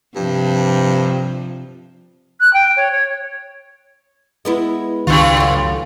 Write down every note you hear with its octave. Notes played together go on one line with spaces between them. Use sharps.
G2 C3 F3
F#6
G5
C#5
C#5
G#3 B3 E4
C#2 G2 D#3 F4
F#2 A2